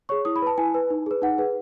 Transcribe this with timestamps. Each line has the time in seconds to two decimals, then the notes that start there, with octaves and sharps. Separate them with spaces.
0.09 G#4 C#5 C#6
0.25 E4 D#6
0.36 B5
0.42 B4 A5
0.58 E4 G#5
0.74 B4
0.90 D#4
1.06 G#4 B4
1.22 D#4 F#5
1.38 G#4 B4